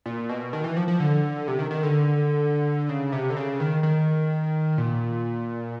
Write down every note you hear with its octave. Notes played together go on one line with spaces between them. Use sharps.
A#2
B2
D#3
E3
F3
F3
D3
C3
D#3
D#3
D3
C#3
C3
D3
C#3
D#3
D#3
A#2